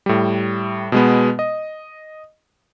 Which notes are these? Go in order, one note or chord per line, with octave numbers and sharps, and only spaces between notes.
A2 G3
B2 G#3 B3
D#5